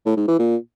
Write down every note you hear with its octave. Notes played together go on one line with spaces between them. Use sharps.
A2
G#2
E3
A#2